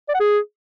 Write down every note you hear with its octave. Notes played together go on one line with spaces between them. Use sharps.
D5
F#5
G#4